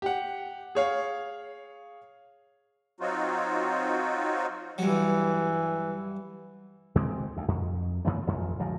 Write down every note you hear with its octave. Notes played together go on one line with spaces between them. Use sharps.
G4 F#5
G#4 C#5 F5
F#3 C4 D#4 F4 F#4
G2 E3 F#3
D2 G#3 C4
D2
F2
F#2 C#3 A3 B3
A1 F2
D1 C#2 F#2 F3